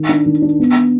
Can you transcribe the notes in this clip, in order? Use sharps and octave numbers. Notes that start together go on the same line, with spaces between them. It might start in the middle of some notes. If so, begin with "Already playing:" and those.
Already playing: D#3
D4
D#3
D4
B3